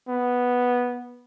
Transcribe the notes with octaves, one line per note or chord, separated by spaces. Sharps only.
B3